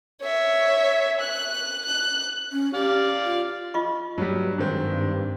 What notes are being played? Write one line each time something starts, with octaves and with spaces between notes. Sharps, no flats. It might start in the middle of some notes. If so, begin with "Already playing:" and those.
C#5 E5
F#6
F#6
C#4
G4 D5 F5
F4
F4 D#5 C#6
G2 F#3 G3
G#2 D#3 C4